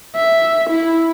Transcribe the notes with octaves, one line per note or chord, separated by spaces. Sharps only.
E5
E4